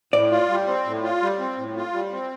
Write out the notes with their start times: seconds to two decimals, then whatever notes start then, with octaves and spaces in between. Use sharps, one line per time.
0.13 A2 D5
0.31 F4
0.49 G3
0.67 C4
0.85 A2
1.03 F4
1.22 G3
1.39 C4
1.57 A2
1.76 F4
1.93 G3
2.12 C4